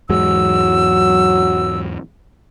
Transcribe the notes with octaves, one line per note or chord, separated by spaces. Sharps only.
E2 G#2 F#3 G#3 E6